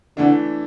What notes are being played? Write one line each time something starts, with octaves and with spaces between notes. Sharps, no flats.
D3 E3 A3 D4